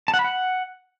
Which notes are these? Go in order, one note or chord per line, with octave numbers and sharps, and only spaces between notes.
A5
F#5
B5
F#5